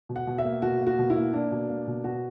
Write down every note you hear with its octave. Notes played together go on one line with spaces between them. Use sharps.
B2
F#5
B2
E5
A#3
B2 F#4
A#3
F#4
B2
E4
A#3
A#3 D4
B2
A#3
B2
B2 F#4